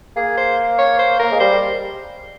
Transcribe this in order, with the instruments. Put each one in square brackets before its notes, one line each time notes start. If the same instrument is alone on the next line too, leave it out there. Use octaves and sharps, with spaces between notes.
[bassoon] A#3 [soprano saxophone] G#4
[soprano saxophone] C5
C#5
C5
[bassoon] A#3 [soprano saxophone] A#4
[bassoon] G#3
[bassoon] G3 [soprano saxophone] C5